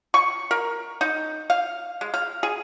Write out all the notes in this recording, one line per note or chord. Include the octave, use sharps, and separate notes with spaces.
C#6
A#4
D#4
F5
G#3
F5
G#4